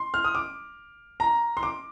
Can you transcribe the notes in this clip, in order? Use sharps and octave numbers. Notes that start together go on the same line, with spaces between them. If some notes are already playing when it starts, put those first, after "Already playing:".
Already playing: C6
F6
D#6
D6
A#5
C6
D6